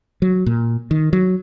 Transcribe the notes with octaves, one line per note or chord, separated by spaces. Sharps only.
F#3
A#2
D#3
F#3